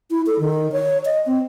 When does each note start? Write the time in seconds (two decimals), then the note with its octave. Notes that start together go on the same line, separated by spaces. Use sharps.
0.11 E4
0.26 A4
0.39 D#3
0.72 C#5
1.05 D#5
1.26 C4